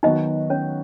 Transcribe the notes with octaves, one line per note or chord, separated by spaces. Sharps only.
D#3 F#3 B3 D#4 F#4 D#5
C#4 C#5